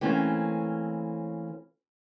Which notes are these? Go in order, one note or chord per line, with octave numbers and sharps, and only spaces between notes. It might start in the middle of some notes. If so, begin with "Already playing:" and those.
E3 A3 A#3 C4 C#4